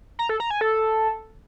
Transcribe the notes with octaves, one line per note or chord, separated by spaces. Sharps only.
A#5
A4
A#5
G#5
A4